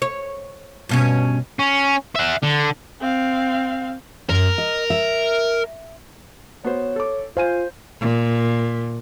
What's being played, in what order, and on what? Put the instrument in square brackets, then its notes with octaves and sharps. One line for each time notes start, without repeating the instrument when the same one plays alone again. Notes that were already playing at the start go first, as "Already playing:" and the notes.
[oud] C#5
G2 B2 C#4
[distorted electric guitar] C#4
E5 F#5
D3
[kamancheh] C4 F5
[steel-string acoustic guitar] F#2 [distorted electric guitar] A#4
[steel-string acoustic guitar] D#5
E5
[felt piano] B3 F#4 C5 [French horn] C#5
[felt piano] A4 D6
[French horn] F4 [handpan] C5 [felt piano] F5 G#5 D#7
[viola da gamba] A#2